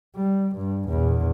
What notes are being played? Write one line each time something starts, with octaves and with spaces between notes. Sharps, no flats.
G3
G2
A#1 E2